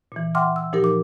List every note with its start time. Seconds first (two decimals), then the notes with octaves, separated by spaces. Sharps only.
0.12 A#2 E3
0.35 E5 F#5 G5 C6 D6 F6
0.56 E6
0.72 A#2 F3 D#4 G4 A#4
0.84 D6